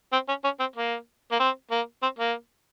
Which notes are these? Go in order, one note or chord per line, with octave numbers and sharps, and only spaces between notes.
C4
C#4
C#4
C4
A#3
A#3
C4
A#3
C4
A#3